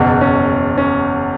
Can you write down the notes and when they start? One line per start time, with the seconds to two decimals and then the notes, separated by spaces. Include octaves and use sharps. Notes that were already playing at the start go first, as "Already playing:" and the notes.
Already playing: F#1 E2 B2
0.21 C#4
0.78 C#4